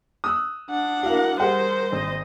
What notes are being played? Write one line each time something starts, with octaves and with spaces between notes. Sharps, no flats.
D#6 E6 F#6
D4 F#5
E4 F#4 A#4 F5
G3 G4 G#4 A#4 C5 F#5
G#1 D#5